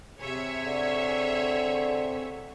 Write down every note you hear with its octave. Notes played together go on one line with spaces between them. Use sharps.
C3 G#4 C#5 E5
D3